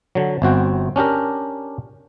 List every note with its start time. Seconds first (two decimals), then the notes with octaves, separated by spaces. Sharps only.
0.15 D3 F#3
0.42 G1 C4 F#4 G5
0.96 C#4 D4 G4 A#4